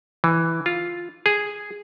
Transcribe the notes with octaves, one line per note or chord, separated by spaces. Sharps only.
E3
F4
G#4